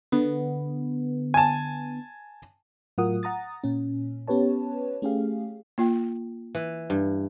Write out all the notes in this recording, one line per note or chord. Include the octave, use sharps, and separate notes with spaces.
D3 B3
G#5 A5
A2 F#3 F4 A#4 F#5 D#6
F#5 A#5 D#6 A6
A#2 C#4
B3 C#4 G4 B4 C#5 A5
A3 C#4 G4 G#4 F5
A#3 F4 G5
E3
G2